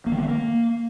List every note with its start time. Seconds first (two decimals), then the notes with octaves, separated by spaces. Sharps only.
0.06 A#3
0.12 D#3
0.17 A#3
0.23 A3
0.28 A#3